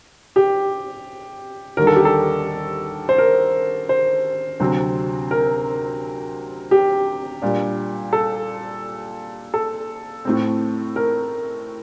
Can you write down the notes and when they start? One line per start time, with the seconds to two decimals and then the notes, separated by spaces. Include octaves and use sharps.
0.36 G4
1.77 D#2 D3 G3 A#4
1.87 A4
1.96 G4
2.05 A4
3.09 C5
3.18 A#4
3.89 C5
4.60 D2 C3 F#3 C4
5.31 A#4
6.71 G4
7.42 A#2 G3 D4
8.13 A4
9.54 A4
10.25 A2 A3 C4
10.96 A#4